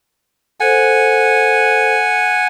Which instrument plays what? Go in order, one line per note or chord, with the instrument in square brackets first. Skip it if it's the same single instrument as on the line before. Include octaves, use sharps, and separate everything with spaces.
[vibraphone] A4 C5 [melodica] F#5 G#5